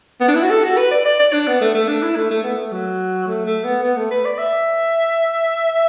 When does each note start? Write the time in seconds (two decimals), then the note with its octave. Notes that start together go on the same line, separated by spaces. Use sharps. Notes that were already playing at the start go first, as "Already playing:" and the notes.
0.21 B3
0.28 D4
0.35 E4
0.43 F#4
0.50 A4
0.64 F#4
0.77 B4
0.91 D5
1.05 D5
1.19 D5
1.33 D4
1.47 B3
1.61 A3
1.74 A3
1.88 D4
2.02 E4
2.16 A3
2.30 A3
2.43 B3
2.57 A3
2.72 F#3
3.27 A3
3.45 A3
3.64 B3
3.83 B3
3.97 A3
4.11 B4
4.25 D5
4.38 E5